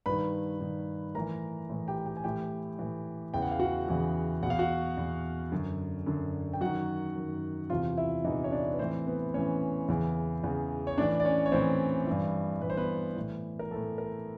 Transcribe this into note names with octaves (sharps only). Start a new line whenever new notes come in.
G2 D#3 B4 B5
G2 D#3
A2 E3 A#4 A#5
A2 E3
G4 G5
G4 G5
G#5
A2 E3 G4 G5
A2 E3
E2 C#3 E3 G5
F#5
F5
F#4 F#5
E2 C#3 E3
E2 B2 F5 F#5
F#4 F#5
E2 B2
F#2 D3
F#2 D3
G5
F#2 D#3 F#4 F#5
F#2 D#3
E2 C3 E3 F4 F5
E4 E5
E2 C3 E3 D#4 D#5
C#5
D4 D5
B4
A2 E3 C4 C5
B3 B4
A2 E3 C#4 C#5
E2 C#3 E3
E2 C#3 E3
C#5
A2 E3 D4 D5
D5
C#4 C#5
C#5
A2 E3 C4 C5
G2 E3
G2 E3 B4
C5
B3 B4
A2 E3
A#4
A2 E3 A4
A#4